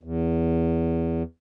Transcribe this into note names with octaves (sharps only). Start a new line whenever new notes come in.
E2